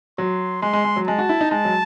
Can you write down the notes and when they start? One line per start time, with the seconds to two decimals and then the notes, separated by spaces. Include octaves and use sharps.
0.18 F#3 C6
0.62 G#3 C6
0.73 G#3
0.85 G#3
0.96 F#3
1.07 G#3 A5
1.19 F#4
1.29 E4
1.41 D#4
1.51 G#3 A5
1.65 F#3